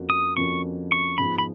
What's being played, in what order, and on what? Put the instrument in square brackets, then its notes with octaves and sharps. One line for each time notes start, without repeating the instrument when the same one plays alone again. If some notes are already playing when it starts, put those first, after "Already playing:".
Already playing: [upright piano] F2 F3 A#3 C#4 F#4
[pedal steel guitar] D#6
[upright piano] F2 F3 A#3 C#4 F#4 [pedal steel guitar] C#6
[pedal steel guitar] C#6
[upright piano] G#2 F3 G#3 B3 F4 [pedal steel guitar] B5
[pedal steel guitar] B5